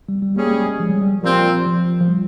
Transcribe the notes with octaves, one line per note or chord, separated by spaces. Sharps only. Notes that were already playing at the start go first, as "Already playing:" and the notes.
G3
G3
G3 A#3 C#4 G#4
A#3
G#3
G#3
F3
G3
G3
A#2 F3 G3 C4 F4
F3
F3
G3